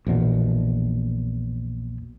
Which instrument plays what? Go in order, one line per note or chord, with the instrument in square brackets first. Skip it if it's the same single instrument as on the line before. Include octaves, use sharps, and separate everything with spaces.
[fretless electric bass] A#1 E2 B2